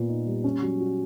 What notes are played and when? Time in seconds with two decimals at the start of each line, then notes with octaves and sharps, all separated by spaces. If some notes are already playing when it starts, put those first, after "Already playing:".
Already playing: A#2 B3
0.09 D#4
0.27 G3
0.44 C#4
0.62 F#3
0.80 F#4